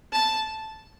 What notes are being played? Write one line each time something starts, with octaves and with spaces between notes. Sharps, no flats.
A5